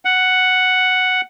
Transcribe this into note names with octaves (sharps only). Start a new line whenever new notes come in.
F#5